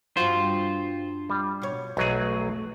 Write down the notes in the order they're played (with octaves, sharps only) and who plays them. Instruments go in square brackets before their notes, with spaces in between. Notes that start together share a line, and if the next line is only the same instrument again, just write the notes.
[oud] G2 C4 F#4 [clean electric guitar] F4 C5
[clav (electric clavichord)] G3
[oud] B2 C#5
[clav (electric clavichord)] B1 F#3 G#4 [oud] E2 A3